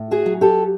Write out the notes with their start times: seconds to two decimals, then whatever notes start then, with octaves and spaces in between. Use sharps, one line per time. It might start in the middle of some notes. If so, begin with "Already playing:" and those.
Already playing: A2
0.11 F#4 G#4
0.26 F#3
0.41 G4 A4